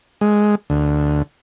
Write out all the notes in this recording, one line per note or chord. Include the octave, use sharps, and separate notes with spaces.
G#3
D2